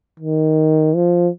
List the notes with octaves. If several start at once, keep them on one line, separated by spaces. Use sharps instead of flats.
D#3
F3